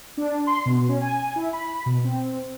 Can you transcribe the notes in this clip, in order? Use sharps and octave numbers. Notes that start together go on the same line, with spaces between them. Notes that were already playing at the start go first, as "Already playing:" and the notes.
D4
C6
B2
C#4
G#5
E4
B5
B2
C4